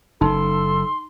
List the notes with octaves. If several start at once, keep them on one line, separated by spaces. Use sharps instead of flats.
F#1 D#4 A4 C6